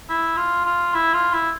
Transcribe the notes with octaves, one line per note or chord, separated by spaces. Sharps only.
E4
F4
F4
E4
F4
E4